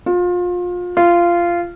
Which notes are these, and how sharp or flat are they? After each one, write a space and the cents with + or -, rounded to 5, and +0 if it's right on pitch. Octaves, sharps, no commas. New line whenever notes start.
F4 +30
F4 -15